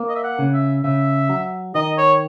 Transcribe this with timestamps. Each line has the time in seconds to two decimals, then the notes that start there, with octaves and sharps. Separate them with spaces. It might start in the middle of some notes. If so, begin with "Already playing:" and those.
Already playing: A#3
0.09 D#5
0.16 E5
0.24 F#5
0.39 C#3
0.54 E5
0.84 C#3 E5
1.29 F#3
1.75 D#3 D#5
1.98 C#5